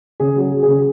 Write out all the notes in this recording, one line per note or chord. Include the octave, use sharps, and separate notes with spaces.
C#3 G#4
F#3
G#4
F#3
G#4
C#3